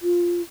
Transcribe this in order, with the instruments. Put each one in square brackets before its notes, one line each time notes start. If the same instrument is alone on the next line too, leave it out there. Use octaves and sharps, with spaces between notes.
[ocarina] F4